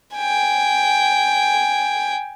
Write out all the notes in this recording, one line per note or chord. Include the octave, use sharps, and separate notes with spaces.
G5 G#5